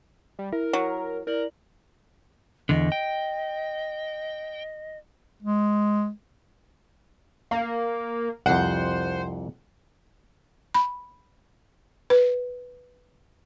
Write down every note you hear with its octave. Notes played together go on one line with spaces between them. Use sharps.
G3
E4 A#4
F#3
E4 A#4 D5 F#7
E2 D3 D#5
G5
G#3
A#3 F5
C2 F2 C5 F#5
B5
B4